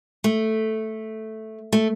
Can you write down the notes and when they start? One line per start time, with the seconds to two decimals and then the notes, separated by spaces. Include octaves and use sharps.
0.24 A3
1.73 A3